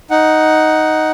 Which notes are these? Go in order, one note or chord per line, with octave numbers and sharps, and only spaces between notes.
D#4 F#5